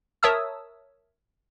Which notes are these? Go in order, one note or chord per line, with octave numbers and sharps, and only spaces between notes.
A#4 C#5 E5 A5 D#6 E6